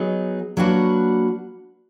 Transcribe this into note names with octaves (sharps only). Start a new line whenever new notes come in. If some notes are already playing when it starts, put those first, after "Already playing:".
Already playing: F#3 B3 D#4 G#4
F#3 A#3 D4 F#4 B4